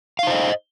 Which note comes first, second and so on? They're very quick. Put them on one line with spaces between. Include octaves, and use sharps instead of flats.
F5 D#4 C5 D#5